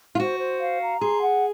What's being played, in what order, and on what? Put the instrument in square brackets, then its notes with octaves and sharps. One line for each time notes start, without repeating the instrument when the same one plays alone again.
[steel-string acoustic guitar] F4
[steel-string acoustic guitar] F#4 [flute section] C5
[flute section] C5
F5
A#5
[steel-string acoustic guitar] G#4 [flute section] C6
[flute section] F#5